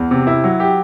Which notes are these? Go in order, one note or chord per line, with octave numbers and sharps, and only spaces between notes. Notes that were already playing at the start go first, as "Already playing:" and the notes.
Already playing: E2
C3
E4
F#3
G4